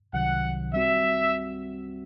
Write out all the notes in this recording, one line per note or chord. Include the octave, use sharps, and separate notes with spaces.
C2 C3 D#3 F#3 F#5
G3 C4 F#4 E5